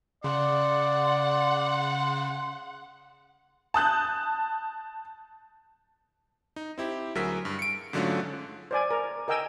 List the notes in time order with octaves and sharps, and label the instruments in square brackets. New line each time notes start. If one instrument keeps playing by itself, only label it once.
[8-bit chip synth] C#3 [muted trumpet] D5 [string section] F#5 [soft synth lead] C6
[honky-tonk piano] A5 D#6 F#6 G6
[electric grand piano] D#4
C4 E4 G4
D2 F#3 G#4 A#4 E6 B6
G2
C#7 D7
G#2 D3 F#3 A3 C#4 F4
[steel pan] C5 D5 G#5
A#4
A#4 D#5 G5 G#5 E6